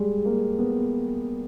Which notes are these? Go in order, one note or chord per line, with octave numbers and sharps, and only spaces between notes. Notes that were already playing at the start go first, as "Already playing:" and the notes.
Already playing: G3 G#3
A#3
B3